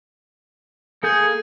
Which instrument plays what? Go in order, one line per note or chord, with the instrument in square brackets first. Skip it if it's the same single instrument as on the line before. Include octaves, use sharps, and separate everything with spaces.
[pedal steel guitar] A#3 A4 G6 [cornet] G#4